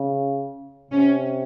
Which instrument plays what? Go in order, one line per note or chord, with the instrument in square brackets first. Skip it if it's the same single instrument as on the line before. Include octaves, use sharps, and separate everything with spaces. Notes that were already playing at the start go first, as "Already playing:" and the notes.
Already playing: [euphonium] C#3
[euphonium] C3 [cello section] C#4